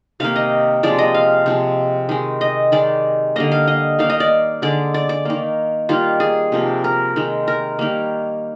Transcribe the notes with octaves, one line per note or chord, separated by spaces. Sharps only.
C3 D#3 A#3 F5
D#5
C3 F3 G#3 D5
D#5
F5
C3 F3 G#3
D#3 G#3
D#5
D#3 G#3 D5
D3 G3 A#3 D#5
F5
D#5
D#3 A#3 F5
D#5
D5
D3 G#3 D5
D5
D5
D#3 A#3
D#3 G3 A#3 F4
G#4
C3 F3 A#3
A#4
D#3 G#3
A#4
D#3 G3 A#3